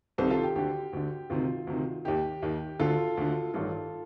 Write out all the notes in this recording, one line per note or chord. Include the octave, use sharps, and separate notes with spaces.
C2 C3 D#3 A4 C5
F4 A4
G4
D2 D3 G4
D2 D3
D2 C3 D#3 F4
D2 C3 D#3
D#2 D#3 G4
D#2 D#3
D2 D3 F4 A4
D2 D3
A1 G2 D#3 F4 A4